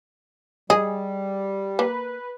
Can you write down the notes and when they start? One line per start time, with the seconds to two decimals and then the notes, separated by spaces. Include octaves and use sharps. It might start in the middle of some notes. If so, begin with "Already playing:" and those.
0.70 G3 G#4 D#5
1.79 A#3 B4